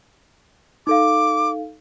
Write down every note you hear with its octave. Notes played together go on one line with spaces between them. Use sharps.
D#4 A4 F5 D6